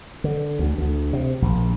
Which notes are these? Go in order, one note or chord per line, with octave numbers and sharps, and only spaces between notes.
D3
D2
D2
C3
A#1